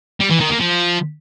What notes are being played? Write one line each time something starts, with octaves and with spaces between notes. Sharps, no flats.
G3
E3
D#3
A#3
F3